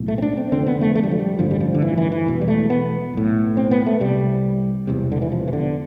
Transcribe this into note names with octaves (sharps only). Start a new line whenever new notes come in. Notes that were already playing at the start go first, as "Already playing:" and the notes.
Already playing: B1 A2
A3
C4
D4
C4
F1 F2 D3 C4
B3
A3
A3
G3
F3
G3
A1 G2 D3 F3
G3
F3
D3
E3
E3
E3
E1 E2 B2
G3
A3
B3
B1 A2
C4
B3
A3
C2 C3 G3
E1 E2 C3
D3
E3
F3
E3
D3